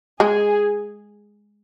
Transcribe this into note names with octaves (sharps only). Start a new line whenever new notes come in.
G#3 G#4